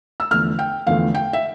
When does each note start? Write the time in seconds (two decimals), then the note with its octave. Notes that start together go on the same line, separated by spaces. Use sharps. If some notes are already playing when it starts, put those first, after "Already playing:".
0.20 E6
0.31 E2 D3 F3 A3 F6
0.59 G5
0.87 E2 D3 F3 A3 F5
1.15 G5
1.33 E5